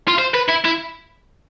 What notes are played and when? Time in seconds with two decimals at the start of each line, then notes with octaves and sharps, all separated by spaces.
0.08 F4
0.19 C5
0.34 B4
0.49 E4
0.65 E4